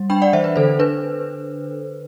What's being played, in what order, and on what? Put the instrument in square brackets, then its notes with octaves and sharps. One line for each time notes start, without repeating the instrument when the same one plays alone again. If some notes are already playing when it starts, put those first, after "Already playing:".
Already playing: [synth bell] G3
D4 G5 B5
D5 F#5
E3 C5 E5
B4
D3 A4 C5
D4 B4